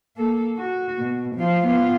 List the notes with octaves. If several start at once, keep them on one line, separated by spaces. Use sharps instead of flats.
A#3 A4
F#4
B2
F3 F4
B3 F4